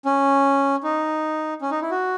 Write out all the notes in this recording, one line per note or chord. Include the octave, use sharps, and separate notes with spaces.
C#4
D#4
C#4
D#4
E4
F#4